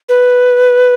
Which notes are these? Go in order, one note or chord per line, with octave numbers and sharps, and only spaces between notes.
B4